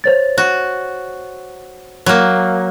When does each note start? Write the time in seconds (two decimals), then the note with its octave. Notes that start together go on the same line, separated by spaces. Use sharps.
0.04 C5 C#5 A6
0.38 F#4
2.06 F#3 A#3